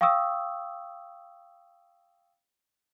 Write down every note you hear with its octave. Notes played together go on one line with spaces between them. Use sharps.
F5 G5 C#6 D#6 E6